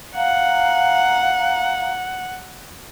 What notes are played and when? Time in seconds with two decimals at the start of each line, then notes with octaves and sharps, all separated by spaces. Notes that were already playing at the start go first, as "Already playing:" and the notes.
0.16 F5 F#5 A#5